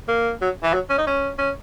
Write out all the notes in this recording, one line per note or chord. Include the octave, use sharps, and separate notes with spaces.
A#3
F#3
E3
F#3
C#4
D#4
C#4
C#4